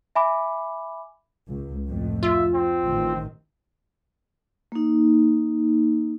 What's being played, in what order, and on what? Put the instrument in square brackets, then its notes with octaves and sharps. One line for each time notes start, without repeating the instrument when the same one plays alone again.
[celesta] E5 G#5 B5 D6
[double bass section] C#2
F2 A2
[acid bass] F4 [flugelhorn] E5
[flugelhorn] C4
[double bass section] A1 A2 D#3
[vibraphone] A#3 D#4